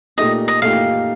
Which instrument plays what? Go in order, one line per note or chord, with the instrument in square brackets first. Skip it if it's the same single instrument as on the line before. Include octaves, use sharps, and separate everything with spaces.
[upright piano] A#2 A3 D#4 G4 [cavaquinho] D#5
[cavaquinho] D#5
[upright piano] A#2 A3 D#4 G4 [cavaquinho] F5